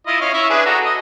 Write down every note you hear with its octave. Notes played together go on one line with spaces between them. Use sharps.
E4 F4 D#5
C#4 F5
C#4 E4 E5
D4 G#4 B4
F#4 A4 A#5
D#5